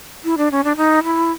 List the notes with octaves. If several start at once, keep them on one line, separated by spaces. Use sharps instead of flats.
E4
D4
C#4
D4
D#4
E4